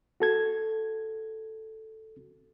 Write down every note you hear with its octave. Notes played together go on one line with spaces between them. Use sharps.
F#4 A4 G#6